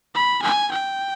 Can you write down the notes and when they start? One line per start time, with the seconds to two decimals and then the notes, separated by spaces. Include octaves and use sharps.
0.14 B5
0.42 G#5
0.72 G5